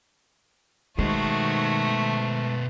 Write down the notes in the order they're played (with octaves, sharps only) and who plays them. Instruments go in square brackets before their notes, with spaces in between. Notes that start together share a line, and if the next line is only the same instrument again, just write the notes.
[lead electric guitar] B2 C5 [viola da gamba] D#3 F#4 [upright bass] G#3 [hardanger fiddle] A3